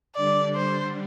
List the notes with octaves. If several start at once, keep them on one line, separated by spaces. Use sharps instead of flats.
D3 G3 D4 D5
C5